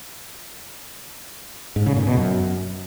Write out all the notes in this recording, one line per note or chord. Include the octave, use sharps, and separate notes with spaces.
G#2
C#3
A#2
B2
F#2